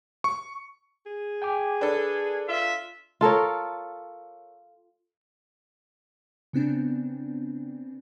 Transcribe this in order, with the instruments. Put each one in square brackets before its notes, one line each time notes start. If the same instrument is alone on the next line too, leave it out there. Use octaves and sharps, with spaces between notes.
[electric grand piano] C#6
[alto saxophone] G#4
[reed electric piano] G5 G#5 D6
[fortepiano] D4 A4 [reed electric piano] B4
[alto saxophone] F4 [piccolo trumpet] E5
[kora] F4 A4 A#4 C#5
[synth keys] C#3 B3 C4 D4